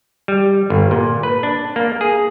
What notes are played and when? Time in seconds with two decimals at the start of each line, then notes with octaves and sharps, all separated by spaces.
0.28 G3
0.70 G1
0.91 A#2
1.23 B4
1.43 D4
1.76 A#3
2.01 G#4